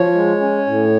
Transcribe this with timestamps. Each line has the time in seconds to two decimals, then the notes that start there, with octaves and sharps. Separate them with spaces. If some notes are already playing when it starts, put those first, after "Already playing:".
Already playing: F3 C#5
0.15 G#3
0.40 C#4
0.67 A2